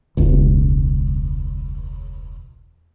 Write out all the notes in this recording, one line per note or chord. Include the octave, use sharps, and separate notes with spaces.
E1 C#2